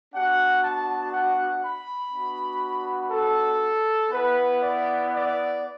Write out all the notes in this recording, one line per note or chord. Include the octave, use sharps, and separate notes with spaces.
B3 D4 F#4 F#5
A5
F#5
B5
B3 D4 F#4
A4
B3 E4 B4
D5
D5